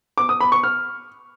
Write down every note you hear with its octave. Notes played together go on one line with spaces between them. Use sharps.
D6
D#6
B5
C#6
F6